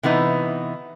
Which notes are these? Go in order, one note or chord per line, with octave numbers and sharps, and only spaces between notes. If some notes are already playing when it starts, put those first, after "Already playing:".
C3 E3 B3 D#4